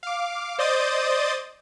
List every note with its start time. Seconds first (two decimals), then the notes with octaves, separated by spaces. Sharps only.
0.03 F5 D6
0.58 C5 D5 D#5 D#6 G6 A6